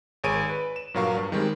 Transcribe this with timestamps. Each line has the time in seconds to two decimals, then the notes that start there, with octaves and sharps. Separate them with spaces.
0.24 G#1 G#4 C#5 G#5 D7 D#7
0.49 B4
0.76 E7
0.94 G2 A#2 F#3 A#4 F5 C#6
1.17 G2
1.32 D#3 G3 G#3 C4